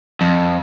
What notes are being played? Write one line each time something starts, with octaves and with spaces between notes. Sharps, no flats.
F2